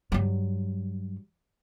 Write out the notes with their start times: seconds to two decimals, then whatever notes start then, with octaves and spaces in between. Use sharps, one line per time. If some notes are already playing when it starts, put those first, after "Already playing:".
0.12 G2 F#3